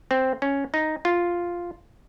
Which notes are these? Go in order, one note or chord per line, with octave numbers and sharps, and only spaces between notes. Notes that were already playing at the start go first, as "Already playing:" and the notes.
C4
C#4
D#4
F4